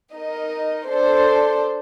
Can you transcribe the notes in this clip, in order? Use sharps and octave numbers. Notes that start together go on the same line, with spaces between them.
D#4 A#4 D#5
D4 A4 C5